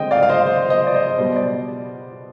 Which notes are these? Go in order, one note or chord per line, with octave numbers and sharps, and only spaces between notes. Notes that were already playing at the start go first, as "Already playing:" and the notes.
Already playing: D3 G#3 C4 D#5 G5
D5 F5
F5
C5 D#5
C5
C5 D#5
D5
C5 D#5
B2 G3 B3 C5
D5